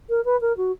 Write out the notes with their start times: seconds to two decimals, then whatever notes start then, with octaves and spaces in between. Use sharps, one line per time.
0.09 A#4
0.25 B4
0.41 A#4
0.57 F#4